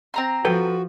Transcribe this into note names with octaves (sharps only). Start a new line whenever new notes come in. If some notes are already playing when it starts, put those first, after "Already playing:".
C4 A#5 C6
F3 F#4 A4 B4 G5